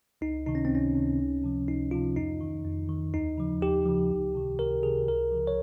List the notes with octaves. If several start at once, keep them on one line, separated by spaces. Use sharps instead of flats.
C#2 D#4
C3 D#3 D#4
C#4
C4
C#2 C#4
C3 D#3
C#2
C3 F3
C#2 D#4
C3 F3 F4
F2 D#4
D#3
F2
D#3
D#2 D#4
C#3 F3
D#2 G4
C#3 F3
C#2
C3 D#3
C#2 A#4
C3 D#3 G#4
C#2 A#4
C#3 F3
C#5